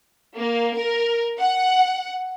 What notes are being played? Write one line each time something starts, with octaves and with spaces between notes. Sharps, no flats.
A#3
A#4
F#5